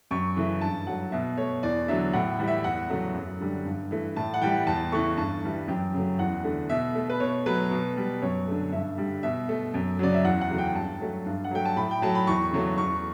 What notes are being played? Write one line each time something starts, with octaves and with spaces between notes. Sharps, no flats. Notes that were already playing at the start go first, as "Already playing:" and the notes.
F#2 C#6
C#3 E3 A3
G2 A5
F#3 A3 F#5
B2 E5
A3 C#5
E2 D5
D3 F#3 A3 E5
A2 F#5
E3 G3
E5
E2 F#5
C#3 F#3 A3
F#2
D3 G3
G2
E3 A3
A2 A5
F#5
E3 G3 G5
E2 A5
C#3 E3 A3 C#6
G2 A5
E3 G3
F#2 G5
C#3 F#3 A3
E2 F#5
D3 A3
B2 E5
A3
B4
B2 C#5
F#3 A3 B4
B2
G3
F#2 C#5
D3 A3
G2 E5
D3 G3
B2 E5
A3
F#2
C#3 F#3 D5
E5
E2 F#5
F#5
C#3 F#3 A3
G5
G2 A5
F#3 A3
G2
F#5
F#3 A3 G5
A5
A2 B5
G5
F#3 A3 A5
B5
E2 C#6
C#3 F#3 A3
E2 C#6